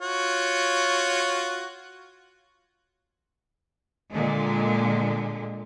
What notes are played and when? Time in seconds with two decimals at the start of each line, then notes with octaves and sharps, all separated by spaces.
0.02 F4 F#4 C#5
4.10 A#2 D3 G#3